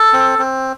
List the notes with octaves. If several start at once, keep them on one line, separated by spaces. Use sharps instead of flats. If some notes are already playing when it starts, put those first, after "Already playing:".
Already playing: A4
C4
C4